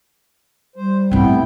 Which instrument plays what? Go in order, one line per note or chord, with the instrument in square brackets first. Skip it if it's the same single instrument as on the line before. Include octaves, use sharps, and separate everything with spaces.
[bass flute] G3 [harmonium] C5
[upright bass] A2 C4 [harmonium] B3 E4 G5